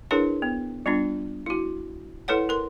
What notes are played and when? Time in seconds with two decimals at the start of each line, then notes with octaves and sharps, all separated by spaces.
0.11 D4 E4 G#4 A#4 B4 C#5
0.42 B3
0.86 G3 B3 D4 F4
1.46 E4 F#4
2.28 E4 A4 B4 C#5 F#5
2.49 A#4 C6